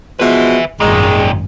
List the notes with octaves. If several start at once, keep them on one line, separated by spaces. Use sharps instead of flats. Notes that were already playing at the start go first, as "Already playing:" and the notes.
B2 F3 G#3 B4 E5
G#1 F#2 A#2 D#3 G#3